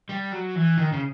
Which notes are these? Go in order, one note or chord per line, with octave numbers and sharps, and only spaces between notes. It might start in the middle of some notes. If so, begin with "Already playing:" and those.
G3
F#3
E3
D#3
C#3